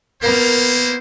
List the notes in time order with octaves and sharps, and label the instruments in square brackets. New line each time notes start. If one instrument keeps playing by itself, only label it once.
[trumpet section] A#3 E4 C5 [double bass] B3 [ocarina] A#4